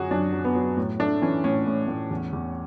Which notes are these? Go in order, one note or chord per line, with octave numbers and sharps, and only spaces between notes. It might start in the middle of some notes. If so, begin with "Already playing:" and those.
Already playing: F#2 D3 F#3 F#4 G#4
F#2 D4
F#3
B3
F#3
A2
A3 D4
E3 C#4
A2 C#4
A2
A2
E2
E2